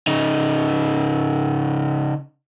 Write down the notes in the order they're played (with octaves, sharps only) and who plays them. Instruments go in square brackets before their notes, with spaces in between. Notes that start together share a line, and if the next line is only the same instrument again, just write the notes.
[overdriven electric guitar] C#3 D#4